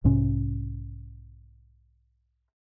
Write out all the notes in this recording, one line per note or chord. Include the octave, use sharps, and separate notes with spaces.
B1 G#2 C3 C#4